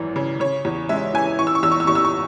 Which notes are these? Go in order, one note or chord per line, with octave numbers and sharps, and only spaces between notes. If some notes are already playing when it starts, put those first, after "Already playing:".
Already playing: G#1 F#2 E3
C#3
C#3 C#5
E2
G#3 E5
E3 G#5
E3 C#6
E6
C#6
E2 E6
C#6
E6
E2 C#6
E6
C#6